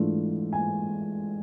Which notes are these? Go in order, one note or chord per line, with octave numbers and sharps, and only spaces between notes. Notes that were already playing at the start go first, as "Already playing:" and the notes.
Already playing: G#2 E3 A3 D4 F4
G#5